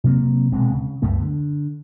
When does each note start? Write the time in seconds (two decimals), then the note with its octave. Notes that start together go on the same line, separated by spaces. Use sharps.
0.04 C3 F#3 A#3 C4
0.52 D#1 B2 G#3 C4
0.72 C#3
1.02 C#2 F#2 A3 B3
1.20 D3